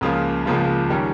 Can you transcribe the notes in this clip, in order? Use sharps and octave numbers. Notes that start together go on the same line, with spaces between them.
C#2 C#3 F3 A#3 F4
C#2 C#3 F3 A#3 F4
D#3 G3 C#4